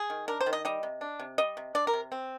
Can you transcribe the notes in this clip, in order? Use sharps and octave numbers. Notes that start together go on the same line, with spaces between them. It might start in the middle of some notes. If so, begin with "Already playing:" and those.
Already playing: G#4
D#3
D4 A#4
C5
D#3
D#5
G3 D#5
C3
D4
C3
G3 D#5
C3
D4 D5
A#4
C3
C4